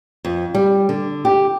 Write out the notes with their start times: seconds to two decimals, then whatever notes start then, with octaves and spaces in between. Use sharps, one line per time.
0.25 F2
0.54 G3
0.89 D3
1.25 G4